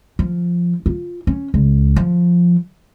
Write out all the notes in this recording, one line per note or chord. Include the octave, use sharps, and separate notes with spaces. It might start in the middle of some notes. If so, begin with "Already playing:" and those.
F3
F4
C#4
C#2
F3